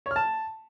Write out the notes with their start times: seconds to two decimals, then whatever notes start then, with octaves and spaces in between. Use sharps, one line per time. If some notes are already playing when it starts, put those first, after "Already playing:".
0.06 C#5
0.11 F6
0.16 A5